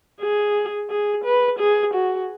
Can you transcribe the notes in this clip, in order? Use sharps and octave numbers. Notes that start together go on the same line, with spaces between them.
G#4
G#4
B4
G#4
F#4